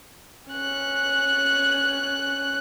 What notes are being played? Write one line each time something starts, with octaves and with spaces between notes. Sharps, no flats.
C#4 F#6